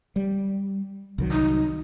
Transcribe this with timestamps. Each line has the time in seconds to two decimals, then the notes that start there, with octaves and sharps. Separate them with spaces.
0.16 G3
1.18 C2 D#3 F#3
1.31 D#4